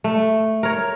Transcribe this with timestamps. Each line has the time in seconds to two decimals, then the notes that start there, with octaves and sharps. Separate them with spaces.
0.04 A3
0.63 A#4 C#5